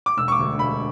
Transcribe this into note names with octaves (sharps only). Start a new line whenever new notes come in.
D6
E1 E6
C#6
D6
D2 D3
E1 B5